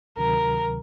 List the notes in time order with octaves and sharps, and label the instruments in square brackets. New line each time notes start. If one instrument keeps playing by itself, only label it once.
[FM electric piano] D2 C3 D#3 F#3 [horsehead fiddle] A#4